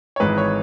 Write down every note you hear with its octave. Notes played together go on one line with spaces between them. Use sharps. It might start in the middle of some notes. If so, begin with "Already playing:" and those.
C#5
G#1 G#2 E3 G#3 B4
C#5